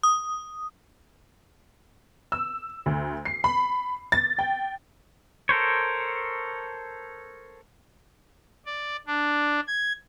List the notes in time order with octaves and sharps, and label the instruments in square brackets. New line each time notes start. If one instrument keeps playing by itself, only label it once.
[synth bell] D#6
[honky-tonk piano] E6
D2
C7
B5
A6
G5
[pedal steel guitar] A4 A#4 C5 C#5
[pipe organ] D5
D4
G#6